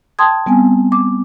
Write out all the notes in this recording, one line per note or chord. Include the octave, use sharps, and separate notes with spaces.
G5 A5 C6 D#6 G#6
G3 B3 C4 G#5
D6